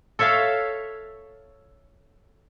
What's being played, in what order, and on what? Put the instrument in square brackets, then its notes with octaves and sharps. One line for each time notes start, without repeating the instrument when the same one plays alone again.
[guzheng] A4 C#5 E5 F5 A5